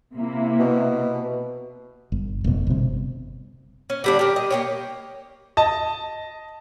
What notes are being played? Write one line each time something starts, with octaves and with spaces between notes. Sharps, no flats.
C3 A#3 E4
B2
G1
F1 B2
G1 C3
C#4
D3 G3 D4
A#3 G4
D#5
A#3 G4 C#5
D#5 A5